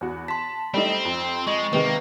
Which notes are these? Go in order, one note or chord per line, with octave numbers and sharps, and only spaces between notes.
E2 F#4
A5 C6 B6
G3 A3 C4 D#4
F2
G#3 D#5 C#6
C3 D#3 G#3 A#3 B4